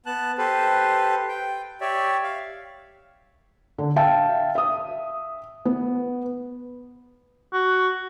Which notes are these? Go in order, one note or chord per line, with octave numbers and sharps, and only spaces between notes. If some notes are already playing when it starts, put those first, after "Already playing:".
B3 A5 F#6
G4 A4 B4 C5
G5
G4 C#5 D5 E5
F5
D3
E5 F5 G5 A5
E5 D#6
B3
F#4